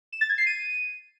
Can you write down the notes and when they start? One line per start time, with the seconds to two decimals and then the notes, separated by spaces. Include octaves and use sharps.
0.13 E7
0.21 A6
0.29 G#6
0.38 C7
0.46 D#7